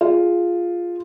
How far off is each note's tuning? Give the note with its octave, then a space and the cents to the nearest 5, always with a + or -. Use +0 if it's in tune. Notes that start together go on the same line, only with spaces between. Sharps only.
F4 +0 G#4 +0